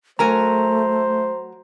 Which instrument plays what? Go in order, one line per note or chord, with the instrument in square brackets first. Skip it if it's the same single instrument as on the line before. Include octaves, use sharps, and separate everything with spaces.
[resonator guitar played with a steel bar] F#3 A#4 G#5 [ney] A3 [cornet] C5 [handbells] A#5